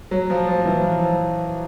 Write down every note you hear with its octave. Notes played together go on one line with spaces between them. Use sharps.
F#3
F3
F3
E3
F3